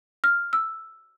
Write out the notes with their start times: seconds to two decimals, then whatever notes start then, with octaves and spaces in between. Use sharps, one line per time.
0.24 F6
0.53 E6